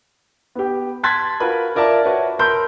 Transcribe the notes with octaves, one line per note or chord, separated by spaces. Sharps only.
B3 G4
A5 C6 F#6 G#6 A6 B6
F4 F#4 A#4 B4 B5
F4 A#4 D5 E5 A5
F#4 B4 C#5 E5
A#4 A5 B5 C6 E6 G6